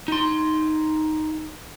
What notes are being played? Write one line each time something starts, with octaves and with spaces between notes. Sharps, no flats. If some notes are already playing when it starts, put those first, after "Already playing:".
D#4 C6